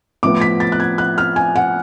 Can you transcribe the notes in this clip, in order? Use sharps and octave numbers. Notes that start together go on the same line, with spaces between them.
A2 F3 B3 D6
B6
A6
F#6
G#6
F#6
F6
G#5
F#5